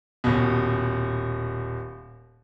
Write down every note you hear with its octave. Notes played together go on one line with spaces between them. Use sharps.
D#1 B2